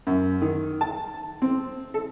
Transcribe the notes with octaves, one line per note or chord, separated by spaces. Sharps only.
F#2
D#3
A5
C4
A4